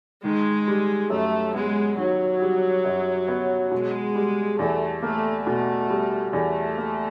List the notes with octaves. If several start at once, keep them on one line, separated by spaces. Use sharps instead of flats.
D#3 G#3
G3
F#2 A3
G#3 B3
D#3 F#3
G3
F#2
B3
B2 G#3
G3
E2 A3
A3 A#3
B2 A3
G3
E2 A3
A#3